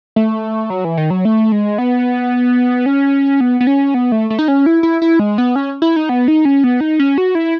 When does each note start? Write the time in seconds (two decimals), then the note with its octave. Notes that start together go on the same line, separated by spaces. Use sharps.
0.16 A3
0.70 F#3
0.85 E3
0.97 D#3
1.10 F#3
1.25 A3
1.52 G#3
1.78 B3
2.86 C#4
3.41 B3
3.60 B3
3.67 C#4
3.94 B3
4.12 A3
4.30 A3
4.39 D#4
4.48 C#4
4.66 E4
4.83 E4
5.02 E4
5.19 G#3
5.38 B3
5.56 C#4
5.82 E4
5.96 D#4
6.09 B3
6.28 D#4
6.45 C#4
6.64 B3
6.81 D#4
6.99 C#4
7.18 F#4
7.35 E4